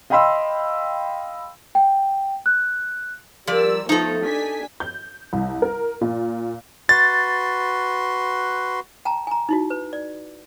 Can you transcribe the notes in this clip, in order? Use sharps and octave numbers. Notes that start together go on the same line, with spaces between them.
D#5 F5 G5 B5 C6 E6
G5
F#6
F3 G3 A#4 D5 E6
F3 A3 B3 D#4 A4
D4 G#5 B6
G6
C2
A#4
A#2
F#4 B4 C6 A6
G5 A5 A#5
G#5 A#5
D#4 E4 F#4
B4
D5